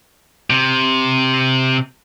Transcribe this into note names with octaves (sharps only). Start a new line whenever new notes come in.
C3